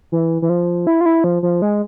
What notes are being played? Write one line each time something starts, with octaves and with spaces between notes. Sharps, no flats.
E3
E3
F3
E4
F4
E4
F3
F3
G#3